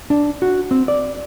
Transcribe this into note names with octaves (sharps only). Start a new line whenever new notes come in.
D4
F#4
C4
D5